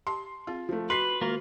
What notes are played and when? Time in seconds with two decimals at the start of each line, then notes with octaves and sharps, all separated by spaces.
0.07 G4 A5 C6
0.47 C4 F4 G#4
0.69 F3 A3
0.90 F#4 B4 C6 B6 C7
1.21 D#3 G#3 A#3 F4 F#4 A#4